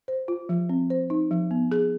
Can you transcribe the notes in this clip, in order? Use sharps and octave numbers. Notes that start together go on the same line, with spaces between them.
C5
F4
F3
C4
C5
D#4
F3
B3
G#4